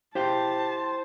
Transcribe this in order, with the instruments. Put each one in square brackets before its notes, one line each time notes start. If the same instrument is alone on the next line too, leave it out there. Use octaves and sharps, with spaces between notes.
[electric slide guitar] E4 F5 G5 [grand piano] G4 [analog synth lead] C5 [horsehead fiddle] A5